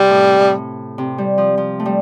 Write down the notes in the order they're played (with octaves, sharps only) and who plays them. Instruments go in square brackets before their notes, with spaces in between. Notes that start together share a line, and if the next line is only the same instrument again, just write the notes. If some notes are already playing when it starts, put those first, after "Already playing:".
Already playing: [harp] C3 [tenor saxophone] G3
[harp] A2
A2
C3
G3
F3
F3
A3
G3